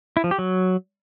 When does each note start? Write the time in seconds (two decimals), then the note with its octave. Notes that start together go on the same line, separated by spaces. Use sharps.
0.17 E4
0.24 F3
0.31 G4
0.39 F#3